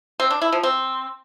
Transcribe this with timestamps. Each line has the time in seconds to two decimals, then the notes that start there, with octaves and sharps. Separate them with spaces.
0.20 C4
0.31 D4
0.41 E4
0.52 F3
0.63 C4